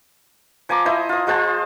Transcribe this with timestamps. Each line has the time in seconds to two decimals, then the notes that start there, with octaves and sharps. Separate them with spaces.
0.69 F3 G#5 A#5 D6
0.85 E4 C5 D#5
1.09 F4 D#6
1.27 G#3 F4 C5 A5